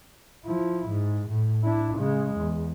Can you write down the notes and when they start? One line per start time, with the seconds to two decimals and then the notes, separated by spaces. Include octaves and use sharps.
0.46 F3 E4
0.89 G#2
1.29 A2
1.64 D4 E4
1.98 C#3 G#3
2.37 E2